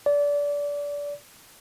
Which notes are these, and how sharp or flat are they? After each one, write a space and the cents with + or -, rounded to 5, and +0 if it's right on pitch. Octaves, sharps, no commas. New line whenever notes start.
D5 -25